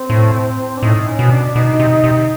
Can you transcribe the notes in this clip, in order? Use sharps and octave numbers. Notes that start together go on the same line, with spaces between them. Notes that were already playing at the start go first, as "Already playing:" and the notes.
Already playing: C4
A2
D4
A2 D#4
C#4
B2
D4
B2 D#4
C3
C3